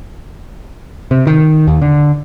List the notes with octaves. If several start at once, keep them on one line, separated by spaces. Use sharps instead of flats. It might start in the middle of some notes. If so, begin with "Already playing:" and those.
C3
D#3
D#2
D3